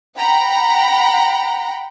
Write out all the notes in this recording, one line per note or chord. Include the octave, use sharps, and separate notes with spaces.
F#5 G5 A#5 B5